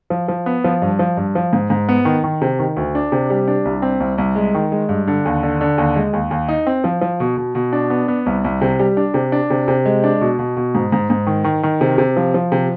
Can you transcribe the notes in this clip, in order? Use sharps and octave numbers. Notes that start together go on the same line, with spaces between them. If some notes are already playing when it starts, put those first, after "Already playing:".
F3
F3
B3
F3
G2
F3
G2
F3
G#2
G#2
B3
D#3
D#3
C3
D#3
D2
D4
C3
G3
D4
C2
C4
C2
C2
G#3
D#3
G#3
G2
D3
D#2
D3
D3
D#2
G#3
D#2
D#2
D#4
C4
F3
F3
B2
B2
B2
D4
B3
B3
C2
C2
C3
G3
D4
C3
D4
C3
C3
G#3
D4
B2
B2
B2
G#2
G#2
G#2
D#3
D#3
D#3
C3
C3
F3
F3
C3